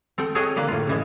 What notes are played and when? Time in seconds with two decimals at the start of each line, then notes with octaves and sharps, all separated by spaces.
0.18 C4 A4 G5
0.35 G#4 A4 C#5 D#5 F#5 G5
0.56 D3 A#3 B4 D5
0.68 A2 F4
0.87 C#3 E3 G#3